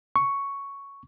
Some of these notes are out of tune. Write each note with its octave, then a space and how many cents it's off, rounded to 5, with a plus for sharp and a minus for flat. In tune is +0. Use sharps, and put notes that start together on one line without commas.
C#6 +5